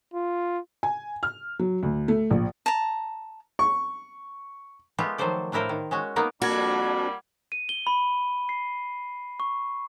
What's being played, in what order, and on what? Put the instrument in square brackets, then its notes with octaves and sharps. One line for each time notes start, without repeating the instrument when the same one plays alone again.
[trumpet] F4
[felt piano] G#5
F6
F#3
D2
A3
A#1
[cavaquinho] A5 A#5
[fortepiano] C#6
[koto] G#3 A3 B3 F4 G4
D#3 F3 F#3 A4 C5 D5
A2 D4 E4 A#4 C5 F5
D#3
G#3 C#4 F#4
A#3 B3 D#4 A#4
[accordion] F2 D4 [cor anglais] G3 [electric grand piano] A#3 G#6 [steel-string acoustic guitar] F#4
[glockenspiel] D#7
G7
B5
C7
C#6